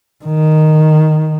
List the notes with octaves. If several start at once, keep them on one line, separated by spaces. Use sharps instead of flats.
D#3